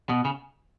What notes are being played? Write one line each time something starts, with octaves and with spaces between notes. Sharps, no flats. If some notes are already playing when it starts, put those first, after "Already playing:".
B2
C#3